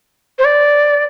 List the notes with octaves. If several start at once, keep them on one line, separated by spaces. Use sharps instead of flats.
C5
D5